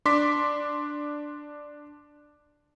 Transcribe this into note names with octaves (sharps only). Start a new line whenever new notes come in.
D4 C6 D6 B6